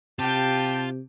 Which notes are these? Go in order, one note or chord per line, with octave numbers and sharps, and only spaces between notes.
C3 F4 G4 G5 A5